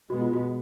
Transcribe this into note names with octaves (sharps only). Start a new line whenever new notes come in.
B2 G#3 B3 F#4
F4
F#4